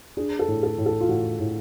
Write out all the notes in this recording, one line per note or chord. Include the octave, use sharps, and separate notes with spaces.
D4 G#4
A4
A2
A4
A2
A4
F4
A2 F#4
A2